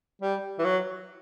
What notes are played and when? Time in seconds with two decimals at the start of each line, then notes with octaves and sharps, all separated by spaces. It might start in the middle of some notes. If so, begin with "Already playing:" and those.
0.22 G3
0.59 E3
0.65 F#3